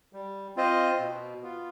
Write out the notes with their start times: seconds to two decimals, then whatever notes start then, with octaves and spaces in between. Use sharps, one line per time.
0.13 G3
0.56 C4 F4 C5 D#5
0.99 B2
1.42 B3 F4